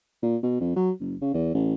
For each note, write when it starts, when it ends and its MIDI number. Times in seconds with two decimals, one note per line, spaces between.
0.23 0.36 46
0.43 0.58 47
0.61 0.76 41
0.76 0.91 54
1.00 1.15 30
1.22 1.32 49
1.34 1.49 40
1.54 1.74 33